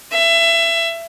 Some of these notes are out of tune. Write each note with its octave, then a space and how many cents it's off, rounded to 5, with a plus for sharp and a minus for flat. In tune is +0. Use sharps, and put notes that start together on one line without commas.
E5 +25